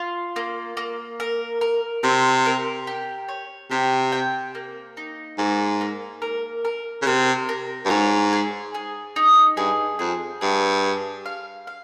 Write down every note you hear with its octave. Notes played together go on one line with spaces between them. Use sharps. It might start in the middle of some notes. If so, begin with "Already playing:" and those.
Already playing: F4
A#3
A#3
A#4
A#4
C3 C4
A#4
G4
C#5
C3 G4
G5
A#3
D#4
G#2 A#3
A#3
A#4
A#4
C#3
C3 A#4
A#4
G2
G#2 C#5
G#4
G#4
D#4
G2 G#4
F2 G#4
G2 G#4
G#4
F5
F5